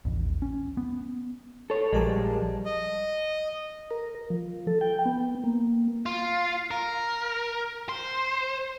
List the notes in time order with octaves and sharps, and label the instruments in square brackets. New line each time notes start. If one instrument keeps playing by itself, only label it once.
[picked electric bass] A1 D#2
C#4
B3
[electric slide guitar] A4 C#5
[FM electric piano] A#1 A#4 A5 [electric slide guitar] F3 G3 G#3
[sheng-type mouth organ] D#5
[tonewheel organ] A#4
F3
A4
G5
B3
A#3
[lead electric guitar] F4
A#4
C5